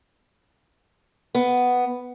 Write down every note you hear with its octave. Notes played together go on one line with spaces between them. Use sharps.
B3